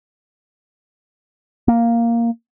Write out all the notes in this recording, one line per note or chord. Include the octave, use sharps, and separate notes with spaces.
A#3